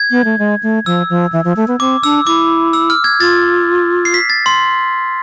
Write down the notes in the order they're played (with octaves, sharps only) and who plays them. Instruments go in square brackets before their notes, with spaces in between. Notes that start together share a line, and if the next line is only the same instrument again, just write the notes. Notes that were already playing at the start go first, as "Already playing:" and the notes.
Already playing: [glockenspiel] G#6
[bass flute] B3
A3
G#3
A3
[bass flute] F3 [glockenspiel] E6
[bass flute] F3
E3
F3
A3
B3
[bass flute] C4 [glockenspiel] D6
[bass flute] D4 [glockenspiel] E6
[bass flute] E4 [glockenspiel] D6
[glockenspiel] E6
F6
G#6
[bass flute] F4 [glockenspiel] A6
[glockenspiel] C7
B6
A6
C6